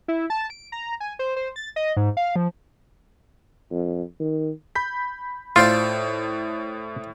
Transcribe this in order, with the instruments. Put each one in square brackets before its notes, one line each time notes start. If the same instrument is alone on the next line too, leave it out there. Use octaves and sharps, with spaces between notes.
[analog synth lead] E4
A5
D7
A#5
G#5
C5
C5
A6
D#5
G#2
F5
F3
[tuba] F2
D#3
[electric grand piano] B5 G6 B6
[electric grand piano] A2 [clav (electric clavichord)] F4 [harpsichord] A4 C5 D5